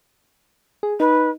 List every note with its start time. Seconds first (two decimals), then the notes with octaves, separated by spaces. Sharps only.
0.83 G#4
1.00 D#4 B4